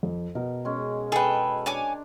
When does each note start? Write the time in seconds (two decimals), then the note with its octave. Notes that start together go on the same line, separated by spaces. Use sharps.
0.03 F2
0.35 B2 A#4
0.65 G#3 C#4
1.12 G#4 A4 B4 G5
1.66 D4 C#5 G#5 D6